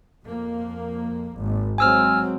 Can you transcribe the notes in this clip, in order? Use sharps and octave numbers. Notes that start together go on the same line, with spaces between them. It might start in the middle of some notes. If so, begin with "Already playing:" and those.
F2 A#3
G#1
F#3 G#3 C4 G#5 E6 F6